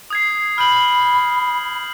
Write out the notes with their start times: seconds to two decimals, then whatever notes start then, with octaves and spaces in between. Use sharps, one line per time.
0.10 D#6 G#6 C7
0.58 B5 F6 G6 F#7